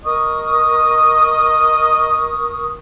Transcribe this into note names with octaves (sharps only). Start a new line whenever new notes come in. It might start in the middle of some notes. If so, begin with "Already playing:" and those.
A#4 D#5 C#6 D#6